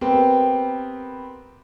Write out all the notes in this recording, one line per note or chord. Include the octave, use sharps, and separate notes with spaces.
B3 C4 G4 A#4